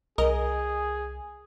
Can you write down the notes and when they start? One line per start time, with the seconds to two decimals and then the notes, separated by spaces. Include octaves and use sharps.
0.18 C2 G#4 A#4 D#5